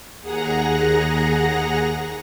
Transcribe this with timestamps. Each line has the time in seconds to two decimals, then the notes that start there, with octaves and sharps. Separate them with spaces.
0.20 D#2 G#4 F#5 A#5 A#6